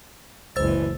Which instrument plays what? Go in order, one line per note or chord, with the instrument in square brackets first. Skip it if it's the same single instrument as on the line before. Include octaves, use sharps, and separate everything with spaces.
[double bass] F#1 C#2 [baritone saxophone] E3 [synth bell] C5 E6 A6